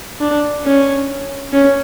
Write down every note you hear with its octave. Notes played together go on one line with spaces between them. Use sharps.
D4
C#4
C#4